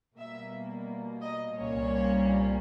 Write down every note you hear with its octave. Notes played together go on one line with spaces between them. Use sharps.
B2 G3 A#3 E5
D#5
C2 A#2 G3 A#3 C#4 C#5